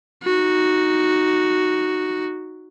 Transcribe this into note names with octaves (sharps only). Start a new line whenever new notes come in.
D#4 F#4